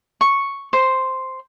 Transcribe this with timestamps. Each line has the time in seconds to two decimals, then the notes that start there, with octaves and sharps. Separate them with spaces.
0.21 C#6
0.73 C5